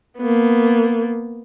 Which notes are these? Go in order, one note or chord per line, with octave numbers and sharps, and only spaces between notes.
A#3 B3